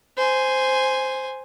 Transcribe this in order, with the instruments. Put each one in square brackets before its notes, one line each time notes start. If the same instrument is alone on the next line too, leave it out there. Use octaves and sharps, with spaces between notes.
[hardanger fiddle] C5 G#5